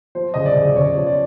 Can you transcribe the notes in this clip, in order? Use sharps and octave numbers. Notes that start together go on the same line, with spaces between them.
F3 C5
C#3 D#5
D5
C#3
C#3 C#5
F3
D5